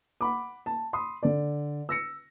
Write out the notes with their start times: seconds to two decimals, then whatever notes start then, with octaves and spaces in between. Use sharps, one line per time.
0.21 F#5 B5 D6
0.66 A5
0.93 B5 C6 D#6
1.23 D3 D5
1.89 E6 A#6 C#7